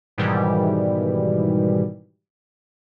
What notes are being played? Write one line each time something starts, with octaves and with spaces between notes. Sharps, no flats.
G#2 B2 D#3 E3 G3